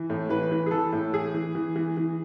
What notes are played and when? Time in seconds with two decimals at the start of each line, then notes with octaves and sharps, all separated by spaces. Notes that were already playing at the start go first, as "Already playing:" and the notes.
Already playing: E3
0.10 A2
0.29 E3 B4
0.51 E3
0.66 G#4
0.71 E3 A4
0.92 A2
1.13 E3 G#4
1.34 E3
1.55 E3
1.76 E3
1.97 E3